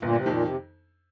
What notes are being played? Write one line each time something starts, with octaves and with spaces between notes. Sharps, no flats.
G1 A#2
C3
F2 A#2 D#3
C3